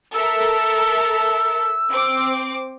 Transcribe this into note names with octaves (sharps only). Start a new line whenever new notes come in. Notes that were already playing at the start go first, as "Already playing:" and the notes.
A4 A#4 E5 E6
C4 D6